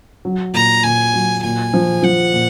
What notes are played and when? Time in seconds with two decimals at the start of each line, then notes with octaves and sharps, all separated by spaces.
0.25 F#3
0.54 A#2 A#5
0.83 A#2 G#5
1.14 F#3
1.43 A#2 G#5
1.74 F3
2.02 F3 F#5
2.33 A#2